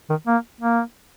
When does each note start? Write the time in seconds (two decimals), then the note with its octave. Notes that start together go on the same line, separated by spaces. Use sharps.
0.10 D#3
0.27 A#3
0.61 A#3